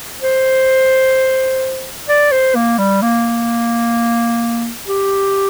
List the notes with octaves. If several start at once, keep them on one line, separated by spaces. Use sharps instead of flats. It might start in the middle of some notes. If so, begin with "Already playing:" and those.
C5
D5
C5
A#3
G3
A#3
G4